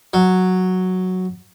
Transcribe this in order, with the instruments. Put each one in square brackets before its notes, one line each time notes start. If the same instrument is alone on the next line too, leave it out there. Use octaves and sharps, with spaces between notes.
[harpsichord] F#3